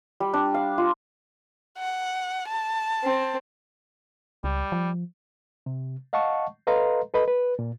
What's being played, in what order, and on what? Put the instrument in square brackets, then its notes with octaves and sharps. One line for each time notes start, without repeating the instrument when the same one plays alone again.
[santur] G3
D4
F5
F4
[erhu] F#5
A5
[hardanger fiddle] C4
[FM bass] C#2 [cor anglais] G3
[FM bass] F3
[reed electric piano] C3
D#5 F5 F#5 A5 C#6
A4 B4 D#5 F5 A#5 C6
A4 B4 D#5 B5
B4
A#2